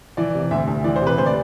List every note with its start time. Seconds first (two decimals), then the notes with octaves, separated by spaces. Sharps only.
0.17 E3 D5
0.34 C3
0.51 D2 E5
0.67 D2
0.84 E3 D5
0.96 C5
1.01 C3
1.07 B4
1.18 D2 C5
1.26 D5